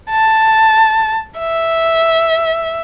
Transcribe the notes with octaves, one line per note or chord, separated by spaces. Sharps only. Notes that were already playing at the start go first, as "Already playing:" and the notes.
A5
E5